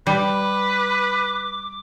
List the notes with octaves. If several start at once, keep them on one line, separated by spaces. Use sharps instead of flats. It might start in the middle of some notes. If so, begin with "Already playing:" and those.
G3 B4 D6